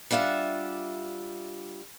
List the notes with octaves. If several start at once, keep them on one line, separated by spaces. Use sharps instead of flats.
G3 D4 F4 E5 F#5